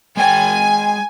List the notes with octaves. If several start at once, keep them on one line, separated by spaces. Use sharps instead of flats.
G#3 G5 G#5